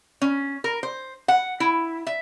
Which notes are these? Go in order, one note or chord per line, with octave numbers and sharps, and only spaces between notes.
C#4
A#4
C5
F#5
E4
E5